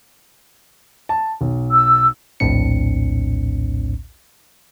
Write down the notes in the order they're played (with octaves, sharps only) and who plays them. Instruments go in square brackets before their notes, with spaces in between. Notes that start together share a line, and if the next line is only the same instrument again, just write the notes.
[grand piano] A5
B1
[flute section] E6
[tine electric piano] A#1 D#2 A2 C4 D4 C#7